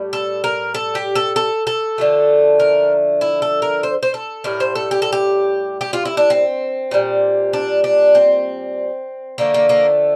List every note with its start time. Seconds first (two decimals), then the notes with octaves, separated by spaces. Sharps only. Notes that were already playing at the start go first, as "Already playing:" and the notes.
Already playing: A2 G3
0.13 A4
0.44 A#4
0.74 A4
0.95 G4
1.15 A4
1.36 A4
1.67 A4
1.98 D3 F3 A3
2.60 A#4
3.21 E4
3.42 A4
3.62 A#4
3.83 C5
4.03 C5
4.14 A4
4.44 A2 G3 A#4
4.60 C5
4.75 A4
4.91 G4
5.02 A4
5.13 G4
5.81 G4
5.93 F4
6.05 E4
6.17 D4
6.30 C4
6.91 A#2 G3
7.53 D4
7.84 D4
8.15 C4
9.38 D3 F3 A3 A#3
9.54 A#3
9.69 A#3